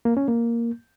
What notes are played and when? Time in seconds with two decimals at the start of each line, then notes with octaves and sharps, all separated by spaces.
0.05 A#3
0.17 C#4
0.28 A#3